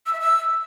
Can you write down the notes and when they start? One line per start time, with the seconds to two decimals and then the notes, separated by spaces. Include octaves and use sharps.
0.06 E6
0.13 E5
0.20 E6